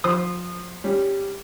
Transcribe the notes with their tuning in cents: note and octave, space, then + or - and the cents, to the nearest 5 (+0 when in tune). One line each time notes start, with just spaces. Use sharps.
F3 +30 C5 +0 D#6 -25
G3 +0 C#4 +0